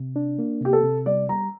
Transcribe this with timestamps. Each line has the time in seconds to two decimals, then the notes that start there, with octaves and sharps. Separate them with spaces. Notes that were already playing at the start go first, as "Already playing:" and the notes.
Already playing: C3
0.16 D4
0.39 A#3
0.61 C3 G4
0.73 A4
0.83 C3
1.06 G3 D5
1.29 G3 A#5